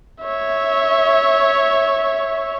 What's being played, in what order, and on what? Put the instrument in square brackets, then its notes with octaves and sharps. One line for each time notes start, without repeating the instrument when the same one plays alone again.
[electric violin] C#5 E5